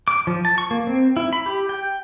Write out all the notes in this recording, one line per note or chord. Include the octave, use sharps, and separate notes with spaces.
D6
F3
A5
C#6
A#3
C4
E4
B5
G4
G5